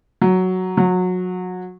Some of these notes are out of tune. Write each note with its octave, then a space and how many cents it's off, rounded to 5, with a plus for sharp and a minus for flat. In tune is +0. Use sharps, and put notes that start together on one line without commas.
F#3 +0
F#3 -25